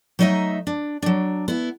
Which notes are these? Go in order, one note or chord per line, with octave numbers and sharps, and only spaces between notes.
F#3 A3 D#4 D#5 E5
D4
F#3 D4
B3 E4